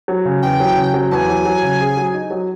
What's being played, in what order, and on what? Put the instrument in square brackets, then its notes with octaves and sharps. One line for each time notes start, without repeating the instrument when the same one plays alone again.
[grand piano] F#3
C#3
[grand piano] E2 [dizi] G5
[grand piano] F#3
C#3
F#3
[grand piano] E2 [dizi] G#5 A5
[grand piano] F#3
F#3
C#3
G#4
F#3
D#4
F#3